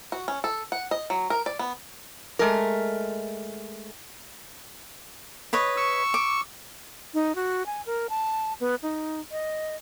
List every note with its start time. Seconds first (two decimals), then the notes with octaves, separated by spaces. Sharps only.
0.12 F#4
0.28 C#4
0.44 A4
0.72 F#5
0.91 D#5
1.10 F#3
1.30 A#4
1.46 D5
1.59 B3
2.39 G#3 A3 A#4
5.53 B4 C#5 D#5
5.77 C#6 E6
6.14 D6
7.14 D#4
7.35 F#4
7.66 G#5
7.86 A#4
8.10 A5
8.60 B3
8.83 D#4
9.31 D#5